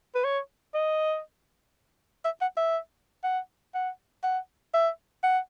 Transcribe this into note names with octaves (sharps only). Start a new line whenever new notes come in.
B4
C#5
D#5
E5
F#5
E5
F#5
F#5
F#5
E5
F#5